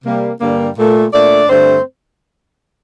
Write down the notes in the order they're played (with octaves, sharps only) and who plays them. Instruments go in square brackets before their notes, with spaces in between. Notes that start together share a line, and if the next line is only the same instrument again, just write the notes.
[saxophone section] C3 G3 A#3
G2 D3 G3 A#3
A#2 A3
A#2 A3 D4 D5
G2 D3 A3 C4 C5